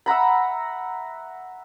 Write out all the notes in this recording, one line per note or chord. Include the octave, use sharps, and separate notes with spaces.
E5 F#5 A#5 B5